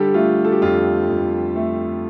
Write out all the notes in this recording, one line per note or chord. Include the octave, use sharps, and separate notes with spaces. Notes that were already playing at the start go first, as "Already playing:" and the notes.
Already playing: D3 G3 G4 A4
A3 F4
A4
G4
F2 F4
F2
A3